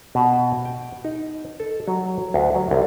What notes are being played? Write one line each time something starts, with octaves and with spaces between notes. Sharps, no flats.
B2
G5
D#4
A4
F#3
D2
F#3
C2